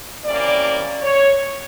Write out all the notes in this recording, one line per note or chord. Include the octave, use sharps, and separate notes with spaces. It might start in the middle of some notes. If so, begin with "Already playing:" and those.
C3 E3 G3 A#3 C#4 D5
C#5